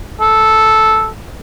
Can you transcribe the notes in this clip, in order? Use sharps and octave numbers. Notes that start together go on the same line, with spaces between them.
A4